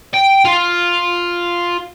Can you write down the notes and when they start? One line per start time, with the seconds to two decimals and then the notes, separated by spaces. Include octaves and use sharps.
0.14 G5
0.45 F4